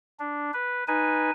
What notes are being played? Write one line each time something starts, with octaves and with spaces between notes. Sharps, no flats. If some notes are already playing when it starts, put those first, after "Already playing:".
D4
B4
D#4 B4 G#5